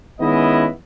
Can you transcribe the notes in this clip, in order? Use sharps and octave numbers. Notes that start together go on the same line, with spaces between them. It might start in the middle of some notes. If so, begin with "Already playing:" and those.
D#3 G#3 B3 C#4 E4 D#5